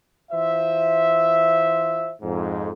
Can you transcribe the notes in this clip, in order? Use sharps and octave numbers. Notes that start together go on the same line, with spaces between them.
E3 F4 C5 E5
F2 G#2